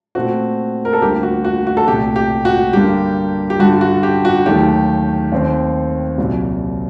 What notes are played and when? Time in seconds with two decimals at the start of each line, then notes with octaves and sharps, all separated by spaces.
0.15 A#2 A3 C4 F#4
0.85 A#4
0.93 A4
1.01 D2 D3 G3 A#3 G4
1.23 F#4
1.45 F#4
1.67 F#4
1.77 A4
1.87 C2 A#2 A3 G4
2.16 G4
2.45 F#4
2.73 G2 D3 G3 A#3 G4
3.50 G4
3.59 G2 D3 G3 F#4
3.81 F#4
4.03 G4
4.25 F#4
4.46 D#2 D#3 F#3 A3 G4
5.32 D#2 D#3 A3 C4
6.18 C2 A#2 F#3